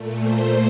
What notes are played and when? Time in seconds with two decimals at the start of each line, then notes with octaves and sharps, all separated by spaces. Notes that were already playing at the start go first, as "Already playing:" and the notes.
Already playing: A#2 A3
0.20 C5